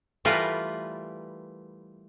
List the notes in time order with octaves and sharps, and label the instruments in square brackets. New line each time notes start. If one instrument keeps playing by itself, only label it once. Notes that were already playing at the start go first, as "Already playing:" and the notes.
[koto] E3 G3 A3 F4 A#4 B4